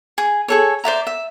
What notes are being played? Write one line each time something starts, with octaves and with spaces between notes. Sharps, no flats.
G#4
G#4 A4 C#5
C5 D5 E5 A#5
E5